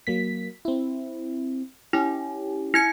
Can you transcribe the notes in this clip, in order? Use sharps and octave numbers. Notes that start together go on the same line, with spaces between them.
F#3 A#3 B6
C4 E4
C#4 E4 G4
E4 G#6 C#7